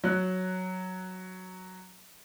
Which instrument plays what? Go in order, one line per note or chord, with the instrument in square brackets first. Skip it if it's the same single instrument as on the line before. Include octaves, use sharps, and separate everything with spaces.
[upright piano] F#3 F#6